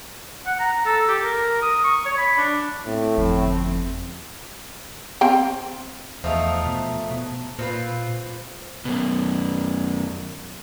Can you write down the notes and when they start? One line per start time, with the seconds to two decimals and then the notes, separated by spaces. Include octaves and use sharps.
0.46 F#5
0.60 A#5
0.86 A4
1.08 G4
1.24 A#4
1.62 D#6
1.84 C#6
2.06 C#5
2.18 B5
2.38 D4
2.86 A2 C4
3.18 G1 F2 C4
5.21 C4 F5 G5
6.24 E2 F3 A3 D#4
6.66 B2
7.11 B2
7.59 A#2 C4 F4 B4
8.85 F#2 B2